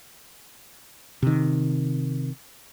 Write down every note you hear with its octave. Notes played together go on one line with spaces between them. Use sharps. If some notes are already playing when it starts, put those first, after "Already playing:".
C3 D#3